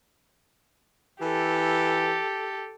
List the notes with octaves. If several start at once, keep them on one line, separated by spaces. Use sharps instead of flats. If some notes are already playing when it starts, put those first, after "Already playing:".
E3 G4 A4